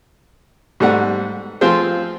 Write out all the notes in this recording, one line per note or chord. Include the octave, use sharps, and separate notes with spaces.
G#2 G3 A3 F#5
F3 A3 C4 F4 G#4 C5